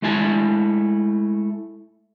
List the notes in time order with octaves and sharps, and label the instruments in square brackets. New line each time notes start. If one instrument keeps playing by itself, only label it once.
[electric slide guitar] G#3 A3 E4 G#5 A5